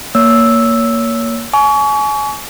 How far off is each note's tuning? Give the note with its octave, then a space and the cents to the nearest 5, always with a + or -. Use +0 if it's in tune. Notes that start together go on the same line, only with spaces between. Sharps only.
A#3 +0 C#5 +25 E6 -5
G#5 +30 C#6 +30